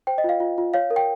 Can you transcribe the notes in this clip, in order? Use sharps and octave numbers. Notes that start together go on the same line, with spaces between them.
C5 G5
D#5
F4 F5
F4
F4
C#5 F5
A#4
G5